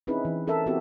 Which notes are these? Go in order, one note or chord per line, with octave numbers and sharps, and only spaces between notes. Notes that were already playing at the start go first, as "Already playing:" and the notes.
C4 C#4 D#4 E4 G#4 B4
E3
C#4 A4 A#4 E5
B3 C4 E4 F#4 G4